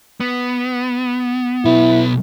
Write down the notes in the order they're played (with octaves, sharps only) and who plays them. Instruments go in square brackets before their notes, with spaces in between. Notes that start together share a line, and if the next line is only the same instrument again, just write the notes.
[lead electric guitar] B3
[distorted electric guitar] B1 B4 [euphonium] E4